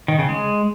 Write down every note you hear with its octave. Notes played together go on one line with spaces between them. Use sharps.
D#3
C#3
G#3